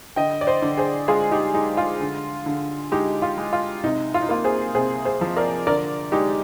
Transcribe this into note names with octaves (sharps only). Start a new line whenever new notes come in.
D3 D#5 G5
D5
C5 D#5
D3
G#4 C5
G#3 F4 G#4
D#4 G4
G#3 D#4
F4
D3
D3
G#3 D#4 G4
F4
G#3
F4
C3 D#4
F4
D#4
A#3 F4
G#4 C5
C3 G#4 C5
G#4 C5
F3
A#4 D5
D3 A#4 D5
G#3 D#4 G4